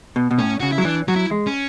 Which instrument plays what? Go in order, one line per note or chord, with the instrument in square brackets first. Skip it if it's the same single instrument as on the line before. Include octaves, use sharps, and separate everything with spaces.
[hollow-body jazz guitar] B2
B2
[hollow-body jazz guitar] A2 [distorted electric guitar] C#4
[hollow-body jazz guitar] C#3 [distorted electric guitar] F#4
[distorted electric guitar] E4
[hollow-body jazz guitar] F#3
[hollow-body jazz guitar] E3 [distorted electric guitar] D4
[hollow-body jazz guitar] F#3 [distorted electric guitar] F#4
[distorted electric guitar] E4
[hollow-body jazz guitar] G#3
[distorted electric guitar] C#4